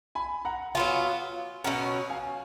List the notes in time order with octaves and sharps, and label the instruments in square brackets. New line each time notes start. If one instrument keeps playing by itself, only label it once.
[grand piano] G#5 B5
F#5 A#5
[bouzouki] F#3 B3 F4 [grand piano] F5 G#5
[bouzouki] B2 F#3 C#4 [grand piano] F#5 A#5
[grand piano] F5 G#5